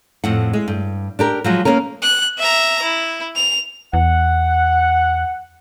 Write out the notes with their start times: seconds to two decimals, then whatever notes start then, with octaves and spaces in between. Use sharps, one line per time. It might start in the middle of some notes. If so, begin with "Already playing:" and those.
0.24 F2 A2 F#5
0.53 G#3
0.68 G2
1.19 D4 G4 A#4
1.44 F3 F#3 G#3
1.65 A#3 B3 C#4 A#4
2.02 F#6
2.39 E5 A#5
2.83 E4
3.36 F7
3.93 E2 F#5